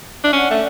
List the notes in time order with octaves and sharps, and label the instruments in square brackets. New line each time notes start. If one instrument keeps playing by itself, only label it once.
[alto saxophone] D4 [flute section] E5
[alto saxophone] C#4 [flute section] D5 F#5
[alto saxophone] A3